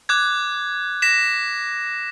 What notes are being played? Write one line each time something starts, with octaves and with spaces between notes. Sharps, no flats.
D6 F#6 G#6
A#6 B6 E7